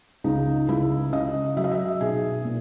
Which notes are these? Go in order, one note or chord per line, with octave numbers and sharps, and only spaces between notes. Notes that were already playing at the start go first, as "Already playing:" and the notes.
C#2 D#4
C#2 E4
C#3 D#5
F#3 E5
D#5
E5
B1 G#4
A#2